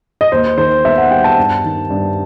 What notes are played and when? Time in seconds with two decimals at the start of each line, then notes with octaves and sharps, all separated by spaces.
0.21 D#5
0.32 D#2 C5
0.58 D#3 C5
0.85 B3 E5
0.98 F#5
1.11 G3 G5
1.24 A5
1.37 G2
1.64 D#3
1.90 G2